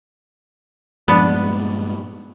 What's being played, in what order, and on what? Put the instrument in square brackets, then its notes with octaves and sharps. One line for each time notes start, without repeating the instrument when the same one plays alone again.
[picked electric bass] G2 A#2 G#3 [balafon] F3 B5 [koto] B3 D4